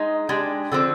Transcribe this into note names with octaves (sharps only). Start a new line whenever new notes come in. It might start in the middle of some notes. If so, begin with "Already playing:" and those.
Already playing: G#3 D#4
G#3 D4 G4
D3 F3 C4